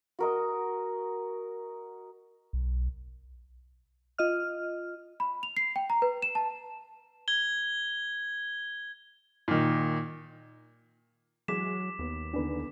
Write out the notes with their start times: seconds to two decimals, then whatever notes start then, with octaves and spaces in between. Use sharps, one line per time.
0.19 F#4 A#4 D#5
2.53 B1
4.18 F4 D#5 F6
5.20 B5
5.43 F7
5.57 C7
5.76 G5
5.90 A#5
6.02 B4
6.22 E7
6.35 A5
7.28 G#6 G7
9.48 A#2 D#3
11.48 E3 F#3 G#3 D6 B6 E7
11.99 D#2 B3
12.34 E2 D3 D4 D#4 B4